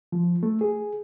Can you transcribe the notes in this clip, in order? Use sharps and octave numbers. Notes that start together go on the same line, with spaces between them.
F3
A3
G#4